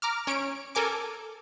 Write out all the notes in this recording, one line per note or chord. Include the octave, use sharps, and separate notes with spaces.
A#5 D6 F6
C#4 C#5 D7
A4 A#4 G#5 D6